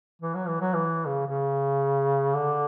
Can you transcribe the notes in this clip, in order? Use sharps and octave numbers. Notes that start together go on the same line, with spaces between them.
E3
F#3
E3
F#3
E3
C#3
C#3
D3